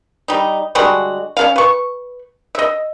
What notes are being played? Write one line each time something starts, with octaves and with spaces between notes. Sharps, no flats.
G3 D#4
D3 G3 G#3 F#4
C#4 D4 F5
B4 C#6
D#5 E5